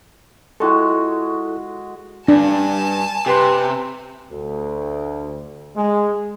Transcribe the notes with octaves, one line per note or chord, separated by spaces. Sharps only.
G#3 E4 F#4 A4
G2 D4 G#5 A5
C3 G4 B4 C6
D2
G#3